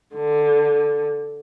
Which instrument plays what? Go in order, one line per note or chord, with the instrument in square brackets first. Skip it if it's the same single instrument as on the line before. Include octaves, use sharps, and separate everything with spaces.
[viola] D3